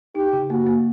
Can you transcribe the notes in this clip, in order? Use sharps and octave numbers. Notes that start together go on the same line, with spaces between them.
D#4 G4
C#3
A#3 F#4
A#3